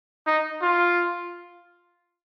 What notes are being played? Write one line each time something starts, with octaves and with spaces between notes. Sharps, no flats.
D#4
F4